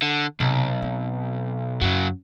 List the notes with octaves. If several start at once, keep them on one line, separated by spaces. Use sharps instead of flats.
D3
B1 C3
C4
F#2 C#3 F#3 C#4